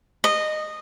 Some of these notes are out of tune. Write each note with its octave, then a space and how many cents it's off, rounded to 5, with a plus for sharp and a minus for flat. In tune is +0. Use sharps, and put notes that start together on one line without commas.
D#5 -15